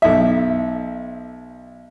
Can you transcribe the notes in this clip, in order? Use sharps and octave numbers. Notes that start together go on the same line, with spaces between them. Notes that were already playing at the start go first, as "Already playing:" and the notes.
B1 E5